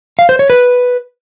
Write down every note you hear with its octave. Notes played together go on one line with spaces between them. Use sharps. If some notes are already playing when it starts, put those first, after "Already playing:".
F5
C5
C#5
B4